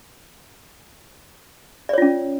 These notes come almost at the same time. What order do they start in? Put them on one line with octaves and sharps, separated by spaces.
D5 C#5 F4 C#4